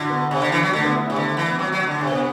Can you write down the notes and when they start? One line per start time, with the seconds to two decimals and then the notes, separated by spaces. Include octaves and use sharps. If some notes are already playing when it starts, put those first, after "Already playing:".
Already playing: D3 E4 F#4
0.10 B3
0.31 C3
0.42 D3
0.52 E3
0.63 F#3
0.73 D3 A3
0.84 B3
0.95 E4
1.06 C3 E4
1.16 D3
1.37 E3
1.47 B3
1.59 F#3 C4
1.72 F#3
1.87 D3
2.01 C3 D4
2.11 B3